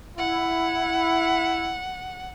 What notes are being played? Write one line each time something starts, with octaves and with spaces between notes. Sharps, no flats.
E4 F#5